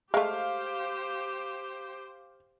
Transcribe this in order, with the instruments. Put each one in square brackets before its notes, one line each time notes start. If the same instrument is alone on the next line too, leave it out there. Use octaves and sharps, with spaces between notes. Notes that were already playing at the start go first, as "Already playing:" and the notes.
[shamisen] G#3 A3 [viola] G4 C5 [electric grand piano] F5